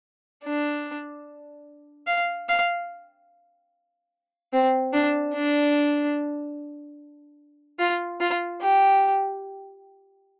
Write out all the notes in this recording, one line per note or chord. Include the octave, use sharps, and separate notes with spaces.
D4
F5
F5
C4
D4
D4
F4
F4
G4